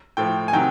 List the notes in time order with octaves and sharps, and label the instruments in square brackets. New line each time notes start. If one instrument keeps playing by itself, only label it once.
[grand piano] A2 F3 G5
G#5
C3 D#3 F#3 G5